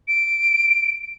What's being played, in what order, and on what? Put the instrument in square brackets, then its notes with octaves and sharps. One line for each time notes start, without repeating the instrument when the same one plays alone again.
[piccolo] D7